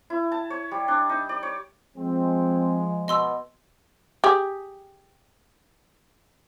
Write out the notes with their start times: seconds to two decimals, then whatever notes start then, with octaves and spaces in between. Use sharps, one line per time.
0.10 E4
0.32 A5
0.50 C#5
0.71 G3
0.88 D4
1.10 D#4
1.29 D5
1.43 C#5
1.96 F3 G#3 C4
3.08 B2 D#5 C6 E6
4.24 G4 G#4